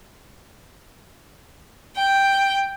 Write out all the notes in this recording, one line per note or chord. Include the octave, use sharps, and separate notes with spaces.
G5